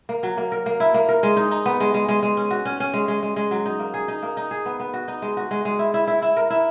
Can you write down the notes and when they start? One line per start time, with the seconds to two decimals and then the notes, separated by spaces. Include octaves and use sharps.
0.09 A#3
0.23 F#3
0.37 A#3
0.52 A#4
0.66 A#3
0.80 E4
0.94 A#3
1.09 A#4
1.23 G#3
1.37 D#4
1.51 D#4
1.66 B3
1.80 G#3
1.94 G#3
2.08 G#3
2.23 G#3
2.37 C#4
2.51 F#4
2.65 C#4
2.80 C#4
2.94 G#3
3.08 G#3
3.23 G#3
3.36 G#3
3.51 F#3
3.65 D#4
3.79 A#3
3.94 G#4
4.08 D#4
4.23 A#3
4.37 D#4
4.51 G#4
4.66 B3
4.80 B3
4.94 F#4
5.08 D#4
5.22 G#3
5.37 F#4
5.51 G#3
5.65 G#3
5.79 E4
5.94 E4
6.07 E4
6.22 E4
6.37 A#4
6.50 E4